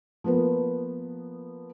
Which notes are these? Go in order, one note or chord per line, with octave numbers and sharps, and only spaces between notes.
F3 A#3 B3 B4